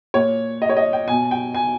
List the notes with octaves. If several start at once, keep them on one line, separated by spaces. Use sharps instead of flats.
A#2 C#5
D#5
C#5
D#5
G5
B2 G#5
G5
G#5